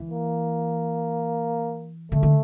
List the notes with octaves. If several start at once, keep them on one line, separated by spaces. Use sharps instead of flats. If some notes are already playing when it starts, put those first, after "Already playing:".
Already playing: E3
A#3
D3 A3
D3